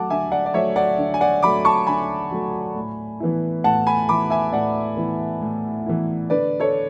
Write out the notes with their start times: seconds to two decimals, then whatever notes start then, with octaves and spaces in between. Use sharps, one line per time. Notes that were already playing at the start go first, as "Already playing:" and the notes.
Already playing: F#3 A3 F#5 A5 D6
0.10 D3 E5 G#5
0.32 D5 F#5
0.46 D5
0.54 F#3 A3 C#5 E5
0.76 D5 F#5
0.98 D3
1.14 G#5
1.21 D5 F#5
1.43 F#3 A3 B5 D6
1.65 A5 C#6
1.87 D3 G#5 B5
2.31 F#3 A3
2.76 A2
3.20 E3 B3 E4
3.64 A2 F#5 A5
3.87 G#5 B5
4.09 E3 B3 E4 B5 D6
4.30 E5 G#5
4.52 A2 D5 F#5
4.97 E3 B3 E4
5.42 A2
5.86 E3 B3 E4
6.30 D3 B4 D5
6.60 A4 C#5